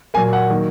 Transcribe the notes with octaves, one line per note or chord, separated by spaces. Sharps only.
A#2 F#3 A#3 G#5
F#5
D#3 F#3 A#3